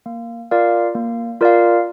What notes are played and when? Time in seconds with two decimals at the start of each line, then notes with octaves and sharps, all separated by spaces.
0.06 A#3
0.51 F4 A#4 D5 F5
0.95 A#3
1.41 F4 A#4 D5 F5